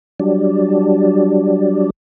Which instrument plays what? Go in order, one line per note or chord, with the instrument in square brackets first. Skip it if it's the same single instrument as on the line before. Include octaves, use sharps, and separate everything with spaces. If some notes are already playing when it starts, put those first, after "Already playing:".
[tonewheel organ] F#3 G3 D4